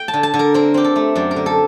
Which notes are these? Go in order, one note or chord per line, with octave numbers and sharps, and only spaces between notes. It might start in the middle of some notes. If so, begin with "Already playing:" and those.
Already playing: G5
A5
D3
A5
D3
A#4
C4 A#4
C4 G4
A4
A3
F#2 D5
A#4
D3
A4